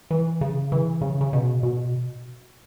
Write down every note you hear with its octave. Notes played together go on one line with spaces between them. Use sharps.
E3
C#3
E3
C#3
C#3
B2
B2